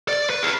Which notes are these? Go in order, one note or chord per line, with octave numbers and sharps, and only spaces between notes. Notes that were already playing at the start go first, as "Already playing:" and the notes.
D5
B4
G#4